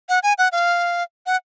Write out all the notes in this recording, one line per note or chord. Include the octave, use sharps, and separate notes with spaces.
F#5
G#5
F#5
F5
F#5